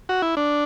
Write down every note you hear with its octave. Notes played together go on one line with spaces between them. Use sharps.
F#4
E4
D4